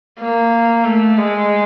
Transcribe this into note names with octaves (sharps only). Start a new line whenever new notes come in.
A#3
A3
G#3